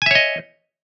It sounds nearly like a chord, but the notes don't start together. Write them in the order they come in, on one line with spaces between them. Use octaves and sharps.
G#5 E5 C#5 D#5